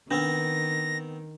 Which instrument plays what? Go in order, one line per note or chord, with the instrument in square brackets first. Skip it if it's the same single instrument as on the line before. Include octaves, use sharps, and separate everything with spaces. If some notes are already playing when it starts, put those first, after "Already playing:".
[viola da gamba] D#3 [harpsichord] B3 C4 [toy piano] D4 B4 [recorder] A#6